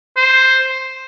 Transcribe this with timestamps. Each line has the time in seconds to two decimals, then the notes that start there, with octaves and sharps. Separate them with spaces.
0.17 C5